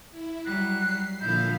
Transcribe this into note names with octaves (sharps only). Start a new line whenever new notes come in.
E4
F#3 G3 F#6
C7
A#2 D3 F3 E4 F5 G6